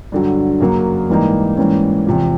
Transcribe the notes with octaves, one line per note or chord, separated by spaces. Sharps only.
G2 D3 F#3
F#2 C#3 F#3 A#3
G#2 E3 G3 A#3 D#4
G#2 E3 G3 A#3 C#4
E2 C3 F3